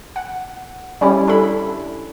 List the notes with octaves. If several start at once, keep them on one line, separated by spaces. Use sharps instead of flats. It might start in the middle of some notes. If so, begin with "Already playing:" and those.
F#5
G3 C#4 E4 G4
D4 E4 A4 B5